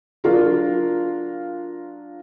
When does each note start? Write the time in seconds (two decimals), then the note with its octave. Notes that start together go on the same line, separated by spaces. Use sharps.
0.24 F#3 D4 F4 A#4